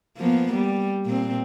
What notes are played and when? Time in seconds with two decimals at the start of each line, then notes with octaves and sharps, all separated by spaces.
0.17 F3 A#3 B3
0.54 G3
1.06 A#2 C4